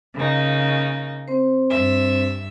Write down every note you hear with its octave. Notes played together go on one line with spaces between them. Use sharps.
C#3 A#3 D#4
C4 C5
G2 E5